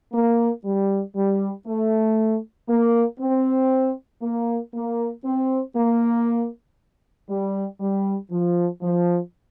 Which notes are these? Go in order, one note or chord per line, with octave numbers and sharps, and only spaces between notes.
A#3
G3
G3
A3
A#3
C4
A#3
A#3
C4
A#3
G3
G3
F3
F3